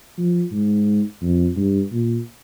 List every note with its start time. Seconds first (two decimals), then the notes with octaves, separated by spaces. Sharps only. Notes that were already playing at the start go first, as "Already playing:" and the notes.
0.18 F3
0.52 G#2
1.22 F2
1.56 G2
1.92 A#2